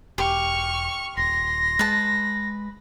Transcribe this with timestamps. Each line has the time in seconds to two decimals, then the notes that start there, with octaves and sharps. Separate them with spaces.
0.18 E1 G4 C#6 F6
1.17 D#1 C6 A#6
1.79 G#3 B4 A5